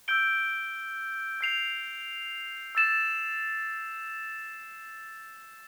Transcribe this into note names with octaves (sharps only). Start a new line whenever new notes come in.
E6 G6 D7 G7
G6 C7 F7
E6 A6 E7